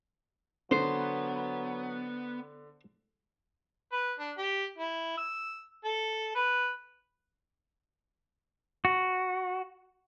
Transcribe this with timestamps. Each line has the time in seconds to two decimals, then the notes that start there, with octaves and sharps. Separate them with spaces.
0.71 D3 F#3 B3 C5
3.92 B4
4.20 D4
4.38 G4
4.78 E4
5.18 E6
5.85 A4
6.35 B4
8.85 F#4